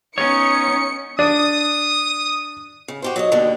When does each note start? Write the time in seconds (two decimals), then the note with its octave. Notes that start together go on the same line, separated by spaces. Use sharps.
0.18 B3 C#4 D#4 C#5 C#7
1.19 D4 D#6
2.88 C#3
3.02 F#4 G4 C5
3.16 F#3 D5 D#5
3.32 D#2 B2 D3 G3